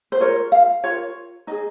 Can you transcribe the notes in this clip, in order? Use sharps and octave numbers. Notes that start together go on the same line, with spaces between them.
C5
F4 A#4 C#5
F5
F4 A#4 C#5
D#4 G#4 D#5